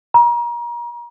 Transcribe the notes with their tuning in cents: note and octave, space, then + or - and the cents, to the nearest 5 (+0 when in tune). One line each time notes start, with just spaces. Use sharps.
A#5 +35